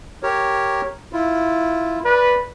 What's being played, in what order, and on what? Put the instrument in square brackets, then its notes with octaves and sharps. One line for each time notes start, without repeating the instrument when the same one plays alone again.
[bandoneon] G4 A#4 C#5
E4 F4
[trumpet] B4 [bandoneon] D5